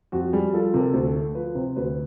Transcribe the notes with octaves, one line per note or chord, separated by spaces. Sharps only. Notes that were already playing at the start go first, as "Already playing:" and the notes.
F2 F#4
G3 G#4
F3 A4
C3 A#4
A4
D2
A4
A3
F3 B4
C3 C5
D2 B4